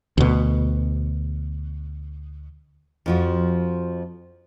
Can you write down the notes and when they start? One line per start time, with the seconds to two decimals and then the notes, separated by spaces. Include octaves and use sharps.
0.18 D2 B2
3.06 F2 F3 F#4